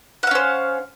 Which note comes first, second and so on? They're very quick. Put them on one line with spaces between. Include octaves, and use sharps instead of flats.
F#5 F5 C#4 C5